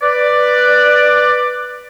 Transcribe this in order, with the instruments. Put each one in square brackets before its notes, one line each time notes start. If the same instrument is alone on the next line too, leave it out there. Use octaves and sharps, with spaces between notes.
[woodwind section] B4 D5